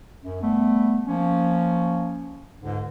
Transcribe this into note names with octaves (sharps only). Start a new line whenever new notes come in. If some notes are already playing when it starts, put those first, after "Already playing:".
F#2
G3 A3 B3
F3 A#3 C#4
C#2 G#2 D3